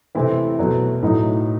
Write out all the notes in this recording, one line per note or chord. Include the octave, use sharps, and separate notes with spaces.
C3 E3 A3 C4 E4
B2 F#3 A3
A2 F#3 A3 D#4